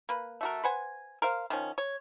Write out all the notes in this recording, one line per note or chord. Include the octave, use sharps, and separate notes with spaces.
A#3 B4
A3 F#4 A#4
B4 C5 F#5 G#5
A#4 C5 F5
D#3 F3 C#4
C#5